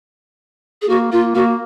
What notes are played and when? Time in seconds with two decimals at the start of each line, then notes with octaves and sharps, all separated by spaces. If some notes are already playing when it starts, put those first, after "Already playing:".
0.82 G#4
0.89 A#3 F#4
1.12 A#3 F4
1.35 A#3 F#4